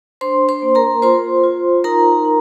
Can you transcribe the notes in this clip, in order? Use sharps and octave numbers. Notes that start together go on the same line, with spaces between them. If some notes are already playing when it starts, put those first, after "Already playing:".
D4 C5 C6
C5 C6
A#3
A#4 A#5
F4 C5 C6
F4
D#4 A#4 A#5
D#4